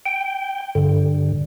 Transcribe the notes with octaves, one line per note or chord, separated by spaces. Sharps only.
G5
G2 D3